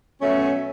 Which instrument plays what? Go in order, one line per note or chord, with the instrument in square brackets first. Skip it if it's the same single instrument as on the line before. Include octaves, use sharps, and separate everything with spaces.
[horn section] B2 F#3 A3 C#4